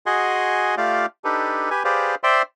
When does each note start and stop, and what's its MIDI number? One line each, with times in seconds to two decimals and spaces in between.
0.06 0.75 66
0.06 0.75 68
0.06 0.75 75
0.06 0.75 78
0.06 0.75 80
0.06 0.75 84
0.77 1.06 57
0.77 1.06 65
0.77 1.06 67
0.77 1.06 74
0.77 1.06 77
0.77 1.06 86
1.24 1.70 62
1.24 1.70 63
1.24 1.70 67
1.24 1.70 69
1.24 1.70 71
1.70 1.83 67
1.70 1.83 71
1.70 1.83 80
1.85 2.15 67
1.85 2.15 68
1.85 2.15 71
1.85 2.15 72
1.85 2.15 74
1.85 2.15 77
2.23 2.42 72
2.23 2.42 74
2.23 2.42 76
2.23 2.42 79
2.23 2.42 84